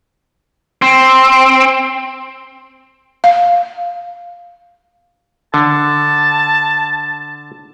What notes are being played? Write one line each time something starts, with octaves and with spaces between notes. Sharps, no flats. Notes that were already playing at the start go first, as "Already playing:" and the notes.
C4
F5
D3 A5